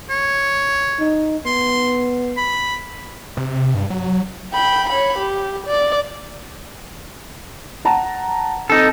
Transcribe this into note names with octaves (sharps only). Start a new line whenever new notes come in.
C#5
D#4
B3 C6
B5
C3
G2
F#3
G5 B5
C#5 B5
G4
D5
F#5 A5 A#5
C4 D#4 A4